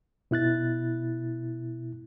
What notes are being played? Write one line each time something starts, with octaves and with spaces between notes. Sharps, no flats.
B2 E4 F#6 A6